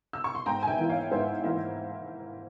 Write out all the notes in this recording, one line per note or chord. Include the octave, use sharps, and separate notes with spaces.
E6
C#6
C6
G#2 G5 A#5
G#5
E5 G5
E3 A#3 E4
C#5 F5
G#2 C5 E5
E3 A#3 E4